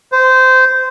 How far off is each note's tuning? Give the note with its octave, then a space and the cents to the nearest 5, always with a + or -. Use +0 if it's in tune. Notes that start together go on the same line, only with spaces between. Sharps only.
C5 -20